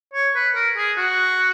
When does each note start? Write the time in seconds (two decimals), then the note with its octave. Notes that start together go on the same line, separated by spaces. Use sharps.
0.14 C#5
0.35 B4
0.55 A#4
0.77 G#4
0.97 F#4